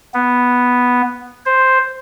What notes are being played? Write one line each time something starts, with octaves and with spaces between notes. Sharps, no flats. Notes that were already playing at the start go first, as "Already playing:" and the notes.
B3
C5